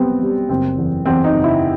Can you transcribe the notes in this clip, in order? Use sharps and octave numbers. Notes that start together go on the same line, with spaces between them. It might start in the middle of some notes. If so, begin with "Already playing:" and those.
Already playing: B1 G3 B3 C4
G3
F#1 C4
E2
E2 C4
D#4
F#1
E4